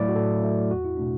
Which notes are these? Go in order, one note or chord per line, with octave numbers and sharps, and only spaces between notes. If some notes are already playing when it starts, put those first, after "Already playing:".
Already playing: A2 F#3 A3 E4 D5
F#4
A2 A4
F#3 A3
E2 F#4
E4
B2 A3 D4